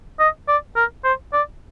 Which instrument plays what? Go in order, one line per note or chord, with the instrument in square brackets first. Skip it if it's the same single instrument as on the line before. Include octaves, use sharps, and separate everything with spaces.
[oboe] D#5
D5
A#4
C5
D5